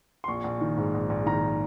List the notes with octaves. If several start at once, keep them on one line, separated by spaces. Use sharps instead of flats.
C6
A#1 C#6
A#1
D#3
G#2
A#1
A#1
D#3 A#5